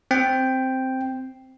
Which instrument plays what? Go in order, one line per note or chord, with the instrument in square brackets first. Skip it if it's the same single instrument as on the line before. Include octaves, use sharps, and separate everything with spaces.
[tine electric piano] C4 G5